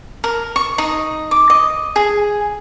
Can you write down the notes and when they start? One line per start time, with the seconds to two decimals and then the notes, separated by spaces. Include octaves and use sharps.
0.24 A#4
0.56 C#6
0.78 D#4
1.31 D6
1.50 D#5
1.96 G#4